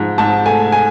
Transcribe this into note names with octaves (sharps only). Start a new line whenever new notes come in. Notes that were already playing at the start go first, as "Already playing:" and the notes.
Already playing: G#2 F3
G#2 A5
A3 G#5
G#5